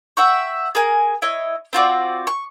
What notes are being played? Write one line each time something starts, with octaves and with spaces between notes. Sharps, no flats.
E5 F#5 G5 C#6
G#4 A#4 G#5
E4 C#5 D#5
C4 F4 F#4 D5
C#6